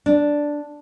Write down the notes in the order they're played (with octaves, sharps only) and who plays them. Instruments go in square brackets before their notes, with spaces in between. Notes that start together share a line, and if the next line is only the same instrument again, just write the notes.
[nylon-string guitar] D4